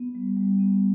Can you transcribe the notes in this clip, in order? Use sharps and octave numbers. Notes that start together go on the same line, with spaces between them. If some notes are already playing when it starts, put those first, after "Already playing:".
Already playing: B3
G3
G3
B3